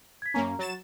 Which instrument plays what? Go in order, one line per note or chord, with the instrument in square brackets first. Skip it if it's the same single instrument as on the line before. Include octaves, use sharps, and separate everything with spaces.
[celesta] G#6 B6
[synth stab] F#2 A#3 C#4 [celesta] A#5
[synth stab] F#3 A6 E7